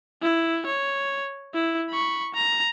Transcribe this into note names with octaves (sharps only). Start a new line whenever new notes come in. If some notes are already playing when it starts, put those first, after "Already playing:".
E4
C#5
E4
B5 C#6
A#5